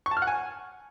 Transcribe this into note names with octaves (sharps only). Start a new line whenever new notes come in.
C#6
A5
F6
F#5
G#5